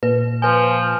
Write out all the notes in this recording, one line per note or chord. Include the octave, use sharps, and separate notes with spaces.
A#2 B4
F3 B4 G#5